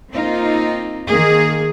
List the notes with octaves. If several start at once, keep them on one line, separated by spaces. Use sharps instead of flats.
A#3 C4 D#4 F4
D#3 A#3 G#4